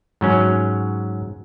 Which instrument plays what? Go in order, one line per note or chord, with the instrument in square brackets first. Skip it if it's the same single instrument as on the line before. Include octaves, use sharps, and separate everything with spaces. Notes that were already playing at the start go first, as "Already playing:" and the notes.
[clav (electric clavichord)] G#2 F#3 C#4